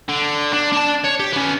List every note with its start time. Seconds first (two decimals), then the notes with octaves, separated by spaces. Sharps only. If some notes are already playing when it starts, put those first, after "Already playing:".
0.09 D3
0.54 D4
0.73 D4 A5
1.05 C#5
1.20 G4
1.32 B3 C#4